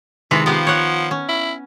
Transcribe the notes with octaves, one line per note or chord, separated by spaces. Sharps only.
C3 D#3 E3 G#3
F3 B3 G4 F5
C#5 F#5
C#4
E4